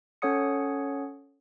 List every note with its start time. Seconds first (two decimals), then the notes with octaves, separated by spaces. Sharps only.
0.22 C#4 A4 C#5 F#5 D#6 C#7